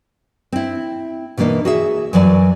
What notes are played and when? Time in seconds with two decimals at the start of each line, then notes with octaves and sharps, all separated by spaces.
0.52 C4 E4
1.37 B2 E3 A#3 D4 D#4
1.65 F#4 G#4 E5
2.13 F#2 E3 F#3 D5 G#5